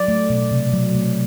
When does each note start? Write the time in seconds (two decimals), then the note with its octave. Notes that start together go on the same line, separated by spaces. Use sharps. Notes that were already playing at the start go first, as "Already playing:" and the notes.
Already playing: F#3 D5
0.08 A3
0.30 B2
0.51 C3
0.73 F#3
0.95 A3